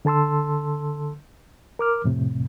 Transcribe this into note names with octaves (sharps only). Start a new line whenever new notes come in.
D3 A4 A5 C6 E6
A#4 D6 F6
F2 A2 C3